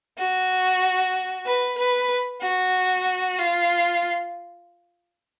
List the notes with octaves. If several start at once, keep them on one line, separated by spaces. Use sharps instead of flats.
F#4
B4
B4
F#4
F4